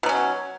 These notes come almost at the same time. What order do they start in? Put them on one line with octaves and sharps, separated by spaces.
B2 F#3 C#4